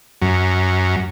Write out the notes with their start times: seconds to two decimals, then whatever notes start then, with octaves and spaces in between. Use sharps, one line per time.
0.22 F#2